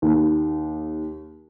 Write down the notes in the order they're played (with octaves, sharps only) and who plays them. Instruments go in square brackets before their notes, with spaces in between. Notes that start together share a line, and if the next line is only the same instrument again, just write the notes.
[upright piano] D#2